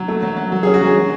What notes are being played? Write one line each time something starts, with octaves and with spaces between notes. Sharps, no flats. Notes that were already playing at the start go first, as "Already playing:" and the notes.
Already playing: F#3
A3
F#3
F#3
F#3
G#4
C#4
F#4
F#3 G#4
F#3